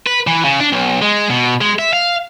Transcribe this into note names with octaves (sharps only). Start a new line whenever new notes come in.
B4
E3
C#3
D4
B1
G#3
B2
G#3
E5
F5